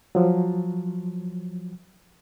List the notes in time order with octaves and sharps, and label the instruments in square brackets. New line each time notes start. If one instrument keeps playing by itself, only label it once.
[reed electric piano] F3 F#3